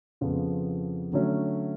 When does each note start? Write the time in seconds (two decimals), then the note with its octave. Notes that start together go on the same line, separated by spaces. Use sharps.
0.21 F2 C#3 F3 B3 F4
1.12 D3 F#3 A3 C#4